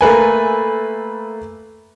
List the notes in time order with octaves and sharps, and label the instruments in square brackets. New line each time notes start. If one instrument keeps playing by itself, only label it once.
[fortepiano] A3 A#3 B4 G#5